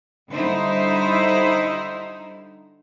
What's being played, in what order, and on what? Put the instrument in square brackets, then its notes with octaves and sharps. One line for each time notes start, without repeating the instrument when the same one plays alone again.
[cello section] D3 G3 D#4 E4 C5